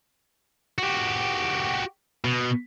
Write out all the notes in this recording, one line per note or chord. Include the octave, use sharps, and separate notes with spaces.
F#4 G4
B2